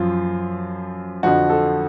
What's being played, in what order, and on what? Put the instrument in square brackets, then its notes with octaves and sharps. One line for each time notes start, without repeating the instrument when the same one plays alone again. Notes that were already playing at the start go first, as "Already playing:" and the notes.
Already playing: [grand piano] F#2 F3 F4
F2 D3 F3 F#4
A4